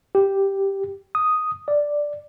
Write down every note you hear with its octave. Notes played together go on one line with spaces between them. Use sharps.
G4
D#6
D5